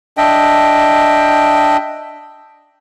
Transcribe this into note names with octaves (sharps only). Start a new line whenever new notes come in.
D4 D#5 E5 G5